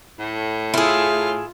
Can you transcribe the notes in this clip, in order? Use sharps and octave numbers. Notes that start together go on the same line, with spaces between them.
A2
E4 F4 G#4